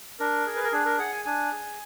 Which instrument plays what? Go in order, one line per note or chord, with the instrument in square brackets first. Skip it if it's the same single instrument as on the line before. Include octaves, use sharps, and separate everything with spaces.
[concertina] D4 A#4
G#4
B4
A#4
D4 G#4
A#4
G#4 F#5
G#5
D4 G#5
G#4